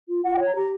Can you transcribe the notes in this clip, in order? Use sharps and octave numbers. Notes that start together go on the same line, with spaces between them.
F4
F4 F#5
G5
C#5
A#5
G4 A#5